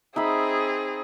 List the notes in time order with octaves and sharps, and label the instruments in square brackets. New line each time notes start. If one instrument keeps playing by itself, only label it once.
[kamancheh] C4 G#4 [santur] D#4 E5 B5